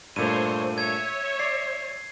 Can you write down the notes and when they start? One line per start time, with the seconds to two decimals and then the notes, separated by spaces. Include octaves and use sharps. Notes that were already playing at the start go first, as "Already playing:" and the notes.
0.16 G2 A#2 A3 C5 C#5 D#7
0.78 C#5 E5 G#6
1.39 D5 C7